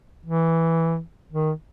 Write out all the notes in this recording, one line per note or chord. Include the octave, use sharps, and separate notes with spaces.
E3
D#3